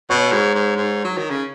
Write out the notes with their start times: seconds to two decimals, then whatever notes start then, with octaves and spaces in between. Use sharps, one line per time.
0.10 B2 C#5
0.32 G#2
0.54 G#2
0.76 G#2
1.04 F#3
1.17 D#3
1.30 C#3